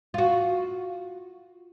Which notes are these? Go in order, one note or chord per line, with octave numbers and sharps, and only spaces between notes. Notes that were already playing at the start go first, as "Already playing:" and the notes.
F4 F#4